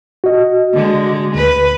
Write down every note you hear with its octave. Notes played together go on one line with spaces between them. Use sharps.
F#4 D#5
D3 G#3
D2 B4